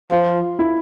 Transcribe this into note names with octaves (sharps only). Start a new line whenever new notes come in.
F3 F4
E4